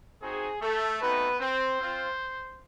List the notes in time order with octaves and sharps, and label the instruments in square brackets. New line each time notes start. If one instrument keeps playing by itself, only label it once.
[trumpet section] C4 D#4 F#4 G#4
A3 A4
A3 B3 C4 D#4 F#4 B4
C4 C5
C4 F4